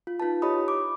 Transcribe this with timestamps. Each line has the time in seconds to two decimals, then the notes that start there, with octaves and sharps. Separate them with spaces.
0.07 F4
0.20 D#4 F4 B4 A5
0.42 E4 G4 C#5 D#5 B5 D#6
0.68 D6